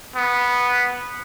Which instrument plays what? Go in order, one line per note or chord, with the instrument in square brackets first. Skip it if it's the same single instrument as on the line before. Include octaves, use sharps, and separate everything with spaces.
[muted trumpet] B3